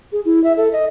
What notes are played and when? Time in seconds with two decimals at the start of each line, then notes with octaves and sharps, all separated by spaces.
0.12 G#4
0.25 E4
0.44 E5
0.57 A4
0.73 D#5